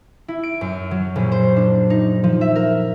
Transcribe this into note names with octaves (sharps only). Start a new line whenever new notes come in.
E4
D7
F#2
F#3
A#1
C5
D4
D#4
F3
E5
A#4